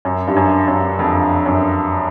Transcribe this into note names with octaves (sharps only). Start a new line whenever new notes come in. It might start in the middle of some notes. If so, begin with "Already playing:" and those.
F#2
G2
F#2
F#2
F2
F#2